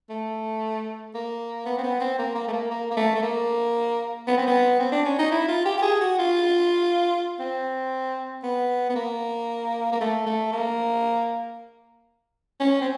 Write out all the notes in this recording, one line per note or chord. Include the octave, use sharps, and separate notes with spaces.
A3
A#3
B3
C4
B3
C4
A#3
A#3
A3
A#3
A#3
A#3
A3
A3
A#3
B3
C4
B3
C4
D4
C#4
D#4
E4
F4
G4
G4
G#4
F#4
F4
C4
B3
B3
A#3
A#3
A3
A3
A#3
C#4
C4